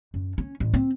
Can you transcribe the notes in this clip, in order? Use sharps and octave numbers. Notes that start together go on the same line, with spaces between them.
F#2
C#4
A1
C4